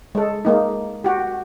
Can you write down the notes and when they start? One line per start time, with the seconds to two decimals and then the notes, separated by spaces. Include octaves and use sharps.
0.15 G#3 A4
0.45 G#3 A#3 D#4
1.04 F#4 G4